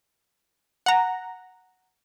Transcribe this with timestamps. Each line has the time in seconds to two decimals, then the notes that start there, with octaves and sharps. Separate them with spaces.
0.86 F#5 A#5